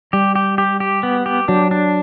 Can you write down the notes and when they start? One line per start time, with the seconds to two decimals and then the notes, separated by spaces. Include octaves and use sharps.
0.13 G3 G4
0.36 G4
0.58 G4
0.80 G4
1.03 B3
1.26 G4
1.48 F#3 D4
1.71 D4